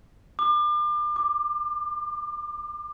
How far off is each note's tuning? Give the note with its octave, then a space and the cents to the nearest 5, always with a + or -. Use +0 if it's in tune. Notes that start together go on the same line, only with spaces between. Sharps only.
D6 +35
D6 +5